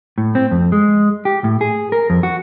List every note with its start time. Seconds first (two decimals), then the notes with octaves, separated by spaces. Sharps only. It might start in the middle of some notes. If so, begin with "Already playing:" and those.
0.18 A2
0.35 C4
0.51 F2
0.72 G#3
1.25 G4
1.44 A2
1.61 G#4
1.92 A#4
2.10 F2
2.23 F#4